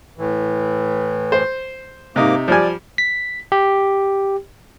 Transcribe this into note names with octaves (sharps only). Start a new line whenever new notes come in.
A2 E3
C5
G#2 C3 A#3 D#4 D6
F3 G3 D5 G#5
B6
G4